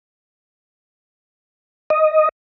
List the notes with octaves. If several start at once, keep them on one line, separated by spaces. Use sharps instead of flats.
D#5